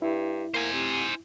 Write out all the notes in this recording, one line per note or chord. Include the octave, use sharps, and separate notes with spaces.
G2 E4
A#3 C5 G#5
C3